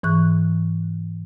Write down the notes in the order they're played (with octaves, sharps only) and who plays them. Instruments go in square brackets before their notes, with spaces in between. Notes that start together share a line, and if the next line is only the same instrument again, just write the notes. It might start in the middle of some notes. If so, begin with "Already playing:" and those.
[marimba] G#2 E3 C#6 F#6